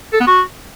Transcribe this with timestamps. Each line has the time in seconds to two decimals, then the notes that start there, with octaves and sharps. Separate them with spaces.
0.13 A4
0.20 B3
0.27 F#4